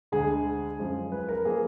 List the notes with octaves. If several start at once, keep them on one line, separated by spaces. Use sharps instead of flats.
D2 D3 G#3 G#4
F#2 F3 G#3
B4
A#4
F3 A#3 G#4